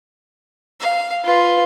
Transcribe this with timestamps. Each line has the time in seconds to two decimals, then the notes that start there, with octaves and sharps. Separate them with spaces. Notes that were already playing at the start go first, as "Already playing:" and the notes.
0.80 F5
1.25 F4 B4